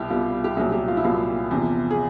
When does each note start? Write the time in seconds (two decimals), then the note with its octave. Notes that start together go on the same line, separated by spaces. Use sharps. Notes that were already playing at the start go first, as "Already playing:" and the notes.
Already playing: C2 B2 G3 E4 G4
0.10 C2 B2 G3 F4
0.44 G4
0.57 C2 A#2 F#3 G#4
0.72 G4
0.88 F4
0.97 E4
1.04 C2 A#2 F#3 F4
1.51 E2 C3 F3
1.91 G#4